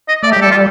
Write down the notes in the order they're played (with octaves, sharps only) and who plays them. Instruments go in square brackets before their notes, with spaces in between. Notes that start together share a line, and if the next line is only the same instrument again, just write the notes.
[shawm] D#5
[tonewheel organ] A3 [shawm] D5
[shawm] G4
[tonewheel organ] G3
[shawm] A4
F4